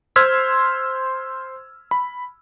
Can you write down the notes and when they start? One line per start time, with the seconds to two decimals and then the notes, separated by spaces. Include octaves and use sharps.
0.16 C5 C6 E6 F6 G#6 B6
1.91 B5